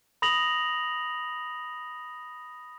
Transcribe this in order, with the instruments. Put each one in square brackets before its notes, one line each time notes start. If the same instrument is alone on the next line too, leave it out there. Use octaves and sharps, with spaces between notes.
[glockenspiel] B5 D#6 A#6 F7 F#7